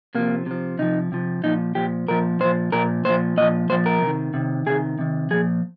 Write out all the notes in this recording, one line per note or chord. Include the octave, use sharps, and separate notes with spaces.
C3 F3 A#3
C3 F3
C3 F3 D#4
C3 F3
A#2 F3 D#4
A#2 F3 G4
A#2 F3 A#4
A#2 F3 C5
A#2 F3 A#4
A#2 F3 C5
A#2 F3 D#5
A#2 F3 C5
A#4
C3
D#3
C3 D#3
C3 D#3 G#4
C3 D#3
A#2 F3 G#4